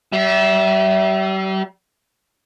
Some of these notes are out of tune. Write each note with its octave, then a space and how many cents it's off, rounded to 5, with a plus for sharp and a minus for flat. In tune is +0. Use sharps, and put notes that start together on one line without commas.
G3 -40 E5 +0